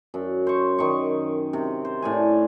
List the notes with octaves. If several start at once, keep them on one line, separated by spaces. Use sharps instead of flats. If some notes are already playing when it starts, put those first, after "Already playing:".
F#2
C5 C#6
D#3 C6 C#6
C3
C5
A2 D4 G#5